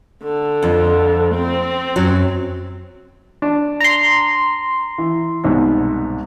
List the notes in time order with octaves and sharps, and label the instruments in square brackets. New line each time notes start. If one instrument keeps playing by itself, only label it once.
[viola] D3
[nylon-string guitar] F2 F3
[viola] C4
[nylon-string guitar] F#2 F#3
[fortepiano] D4
[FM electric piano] A#5 C6
[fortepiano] E3
C2 G#2 B2